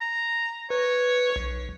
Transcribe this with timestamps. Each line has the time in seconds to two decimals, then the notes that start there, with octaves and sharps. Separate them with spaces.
0.01 A#5
0.70 B4 C#5
1.36 B1